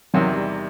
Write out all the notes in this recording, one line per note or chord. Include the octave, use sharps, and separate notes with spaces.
E2 C3 D#3 F#3
G3